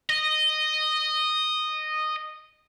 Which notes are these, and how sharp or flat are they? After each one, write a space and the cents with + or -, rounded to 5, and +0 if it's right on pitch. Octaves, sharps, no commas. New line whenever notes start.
D#5 -10